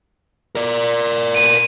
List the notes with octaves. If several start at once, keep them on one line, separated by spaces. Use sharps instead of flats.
A#4 D5
D#7